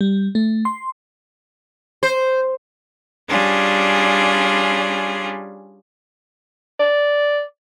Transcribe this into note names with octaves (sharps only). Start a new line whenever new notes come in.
G3
A3
C6
C5
G3 C#4 D4 F4 G#4
D5